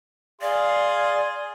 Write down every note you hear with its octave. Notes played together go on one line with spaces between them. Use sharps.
G#4 D5 F5 C6